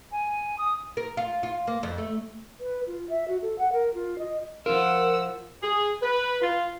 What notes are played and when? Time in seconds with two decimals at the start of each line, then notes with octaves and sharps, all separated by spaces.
0.12 G#5
0.58 D#6
0.97 A#4
1.17 F4
1.43 F4
1.67 A#3
1.83 F2
1.98 A3
2.60 B4
2.86 F4
3.09 E5
3.27 F#4
3.41 A4
3.58 F#5
3.72 A#4
3.94 F4
4.18 D#5
4.66 F3 F4 A#4 F#5 E6
5.63 G#4
6.02 B4
6.42 F4